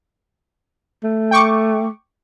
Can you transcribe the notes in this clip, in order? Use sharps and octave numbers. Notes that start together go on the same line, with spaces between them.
A3
G5 C#6 D6